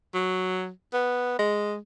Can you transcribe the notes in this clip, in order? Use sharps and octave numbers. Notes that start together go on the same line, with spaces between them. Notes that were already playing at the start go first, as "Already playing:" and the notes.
F#3
B3
G#3